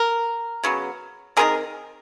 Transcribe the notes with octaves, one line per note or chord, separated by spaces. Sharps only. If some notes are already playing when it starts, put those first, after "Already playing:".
Already playing: A#4
C#3 F#3 B3
D#3 G#3 C4 G#4 A#4